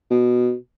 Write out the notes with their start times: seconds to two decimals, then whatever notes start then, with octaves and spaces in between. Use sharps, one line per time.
0.11 B2